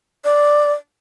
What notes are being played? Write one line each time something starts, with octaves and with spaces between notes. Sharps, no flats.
D5